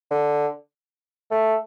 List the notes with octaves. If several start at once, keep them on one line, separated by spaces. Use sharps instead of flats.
D3
A3